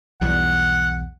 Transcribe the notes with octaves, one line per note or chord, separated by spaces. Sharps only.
B1 E2 G3 F#5